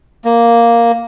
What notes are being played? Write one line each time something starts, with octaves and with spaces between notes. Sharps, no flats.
A#3